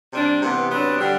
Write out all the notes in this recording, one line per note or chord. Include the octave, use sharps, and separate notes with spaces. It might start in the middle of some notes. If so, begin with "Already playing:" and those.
C3 G3 D4
C3 E3 B3
C3 F#3 B3 D4
D3 G3 D4 G4